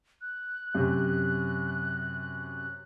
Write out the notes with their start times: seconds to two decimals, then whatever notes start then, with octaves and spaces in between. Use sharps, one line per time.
0.22 F#6
0.75 F#2 C3